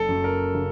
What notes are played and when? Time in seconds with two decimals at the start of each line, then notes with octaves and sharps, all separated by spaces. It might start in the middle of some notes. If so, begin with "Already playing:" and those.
Already playing: F#1 A4
0.09 F#2
0.24 A#4
0.55 C#3